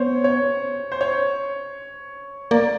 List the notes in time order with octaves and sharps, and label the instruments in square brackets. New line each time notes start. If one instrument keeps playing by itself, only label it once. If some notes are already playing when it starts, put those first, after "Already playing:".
Already playing: [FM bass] B3 [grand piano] C5 C#5
[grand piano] C#5
C5
C#5
[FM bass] A#3 [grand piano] D5